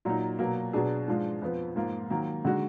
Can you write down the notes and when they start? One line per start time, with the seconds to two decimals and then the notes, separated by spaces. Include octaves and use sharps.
0.05 A#2 F#3 A#3 D#4
0.39 B2 F#3 A#3
0.73 B2 F#3 D4 G#4
1.08 G#2 F3 G#3 D4 F4
1.42 F2 F3 B3
1.76 G#2 F3 A#3 F4
2.10 D#3 F#3 A#3
2.45 D3 G#3 D#4 F#4